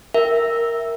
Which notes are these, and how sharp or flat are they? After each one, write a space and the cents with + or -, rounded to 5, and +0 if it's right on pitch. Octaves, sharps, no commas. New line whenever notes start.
A#4 +0 E5 +0 G5 +0